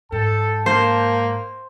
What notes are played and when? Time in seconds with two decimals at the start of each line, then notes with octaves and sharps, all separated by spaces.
0.12 G#2 A4 G5 A5
0.66 A#3 C5